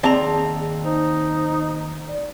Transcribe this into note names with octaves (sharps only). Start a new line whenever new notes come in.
D#2 C4 G#4 D5 A5 A#5
D#4 C5
D5